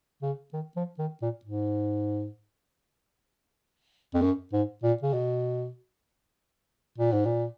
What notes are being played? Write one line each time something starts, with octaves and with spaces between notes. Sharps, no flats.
C#3
D#3
F3
D#3
A#2
G#2
F2
F#2
G#2
A#2
C#3
B2
A#2
G#2
A#2